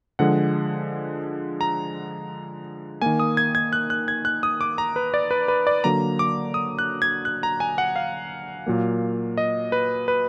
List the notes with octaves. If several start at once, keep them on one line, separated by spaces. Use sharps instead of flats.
D3 F3 G#3 F#5
A#5
D#3 A#3 G#5
D#6
G#6
G#6
F#6
F#6
G#6
F#6
D#6
D6
A#5
B4
D5
B4
B4
D5
D3 F#3 A#3 A#5
D6
D#6
F#6
G#6
F#6
A#5
G#5
F#5
F5
A#2 F#3 A#3
D#5
B4
B4